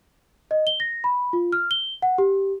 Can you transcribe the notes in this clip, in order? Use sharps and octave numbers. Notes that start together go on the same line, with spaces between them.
D#5
G7
A#6
B5
F4
F6
G7
F#5
G4